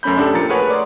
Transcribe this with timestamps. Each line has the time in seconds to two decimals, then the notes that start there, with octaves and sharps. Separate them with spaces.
0.03 F#2 A3 C#4 B5 G6
0.18 D4 G4 A4
0.34 A#2 F3 A#4 A#5 A6 C#7
0.49 A3 G#4 A#4 B4 C#5 F#5
0.70 D5 C6